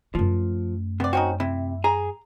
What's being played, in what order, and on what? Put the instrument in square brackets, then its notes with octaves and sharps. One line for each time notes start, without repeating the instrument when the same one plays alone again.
[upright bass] F#2 A3 [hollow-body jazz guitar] F3
[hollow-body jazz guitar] C3 [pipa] B3 D5
[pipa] C4 C#4 D#4 [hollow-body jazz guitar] F#4
[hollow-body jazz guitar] C3 [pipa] E4
[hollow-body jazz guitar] G#4 [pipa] A#5